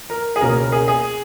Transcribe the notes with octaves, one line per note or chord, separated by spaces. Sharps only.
A#4
G#4
C#2 B2 A#3 C#4 A#4
A#4
G#4
G#4